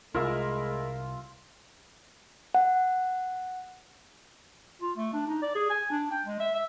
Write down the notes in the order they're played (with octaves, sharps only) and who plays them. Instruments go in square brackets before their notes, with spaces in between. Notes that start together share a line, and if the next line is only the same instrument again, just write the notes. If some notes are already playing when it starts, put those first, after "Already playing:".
[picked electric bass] C2 [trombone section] G#3 [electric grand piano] E4 A#4 [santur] F4 E6
[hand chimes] F#5
[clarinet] F4
A3
D4
D#4
D5
G#4
G#5
D4
G5
G#3
E5
E5